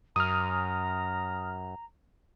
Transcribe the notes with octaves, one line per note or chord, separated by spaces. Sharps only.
F#2 A#5 D#6 F6